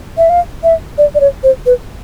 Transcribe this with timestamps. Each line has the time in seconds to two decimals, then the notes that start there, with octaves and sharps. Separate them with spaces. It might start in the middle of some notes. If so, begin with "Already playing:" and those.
0.18 E5
0.30 F5
0.63 E5
0.98 D5
1.15 D5
1.20 C#5
1.43 C5
1.66 B4